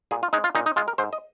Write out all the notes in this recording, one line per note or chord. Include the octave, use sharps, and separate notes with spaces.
A#2 G#4
F4
G#3 D#4
F4
A#2 D#4
D#4
G#3 F4
A#4
G#2 C5
D#5